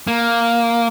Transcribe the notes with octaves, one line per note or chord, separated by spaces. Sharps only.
A#3